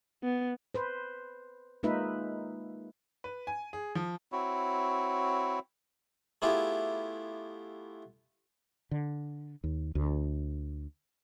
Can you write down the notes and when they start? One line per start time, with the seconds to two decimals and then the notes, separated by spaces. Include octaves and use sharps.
0.23 B3
0.74 B4 C5
1.83 G#3 A#3 D#4 F4 B4 E5
3.24 B4
3.47 G#5
3.73 G#4
3.95 F3
4.32 C4 E4 F#4 C#5
6.42 A3 B3 E4 F4 G4 G#4
8.91 D3
9.64 D#2
9.95 D2